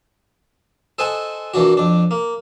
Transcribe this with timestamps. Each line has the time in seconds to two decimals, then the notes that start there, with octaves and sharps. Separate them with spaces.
0.99 A4 C5 D#5 F#5 G#5 A5
1.54 A#2 E3 D4 F#4
1.77 F2 D4
2.11 A#3